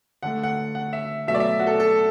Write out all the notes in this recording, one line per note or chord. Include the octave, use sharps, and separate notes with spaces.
D3 A3 F#5
F#5
F#5
E5
B2 F#3 A3 E5
D5
E5
F#4
A4
A4